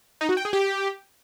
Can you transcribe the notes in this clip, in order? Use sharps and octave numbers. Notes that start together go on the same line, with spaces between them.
D#4
F#4
G5
G#4
G4